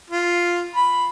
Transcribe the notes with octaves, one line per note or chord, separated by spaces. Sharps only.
F4
B5